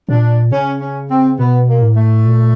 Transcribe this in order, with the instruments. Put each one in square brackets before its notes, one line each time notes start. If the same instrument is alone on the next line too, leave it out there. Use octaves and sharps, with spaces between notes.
[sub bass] A#2 [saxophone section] D4
[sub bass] C#3 [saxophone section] C#4
[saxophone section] C#4
C4
[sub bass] B2 [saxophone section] B3
[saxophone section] A#3
[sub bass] A2
[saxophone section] A3
[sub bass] A#2